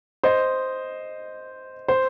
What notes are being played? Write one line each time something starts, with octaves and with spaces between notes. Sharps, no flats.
C5 D#5
C5